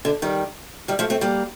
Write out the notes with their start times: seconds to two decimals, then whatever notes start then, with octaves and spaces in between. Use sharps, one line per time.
0.05 D3
0.22 D#3 G3
0.88 D#3 G3
0.99 F3 A3
1.10 A3 C4
1.21 G3 A#3